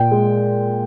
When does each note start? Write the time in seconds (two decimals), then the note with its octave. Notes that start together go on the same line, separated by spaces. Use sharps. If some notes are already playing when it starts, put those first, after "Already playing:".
Already playing: A#2 G5
0.11 G#3